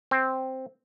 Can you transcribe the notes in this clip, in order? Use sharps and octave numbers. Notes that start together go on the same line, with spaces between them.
C4